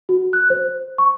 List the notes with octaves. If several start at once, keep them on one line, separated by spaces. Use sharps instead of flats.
F#4
F#6
C5
C#6